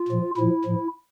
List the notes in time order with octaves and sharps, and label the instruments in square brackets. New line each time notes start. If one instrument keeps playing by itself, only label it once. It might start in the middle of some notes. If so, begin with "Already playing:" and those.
Already playing: [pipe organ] F4
A#2 F3
A#2 F3 E4
A2 F3